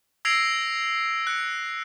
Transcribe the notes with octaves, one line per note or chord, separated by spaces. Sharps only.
E6 G#6 A#6 C7 D7 F7
F#6 C#7